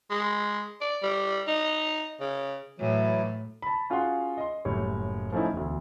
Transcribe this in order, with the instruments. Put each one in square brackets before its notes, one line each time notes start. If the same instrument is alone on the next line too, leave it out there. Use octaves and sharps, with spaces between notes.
[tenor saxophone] G#3
D5
G3
D#4
C#3
[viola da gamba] A2 [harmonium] E3 F#3
[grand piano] A5 B5
C#4 F4 F#4 G#4 F#5 C6
D#5 C6
F#1 A2 G3 C#5
F3 A3 C#4 D#4 E4
E1 D2